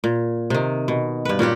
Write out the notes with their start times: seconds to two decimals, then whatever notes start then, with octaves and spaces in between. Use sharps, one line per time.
0.04 A#2
0.50 C3 D#3
0.88 B2
1.25 G2 B4
1.39 A#2 C#4 F#4 G4